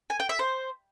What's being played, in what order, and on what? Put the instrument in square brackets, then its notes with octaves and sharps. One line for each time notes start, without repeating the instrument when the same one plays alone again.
[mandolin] G#5
G5
E5
C5